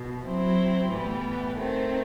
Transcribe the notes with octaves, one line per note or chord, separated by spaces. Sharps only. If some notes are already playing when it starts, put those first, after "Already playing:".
Already playing: B2
F#3 C4 E4
A2 E3 G3 B3
D#3 A3 C4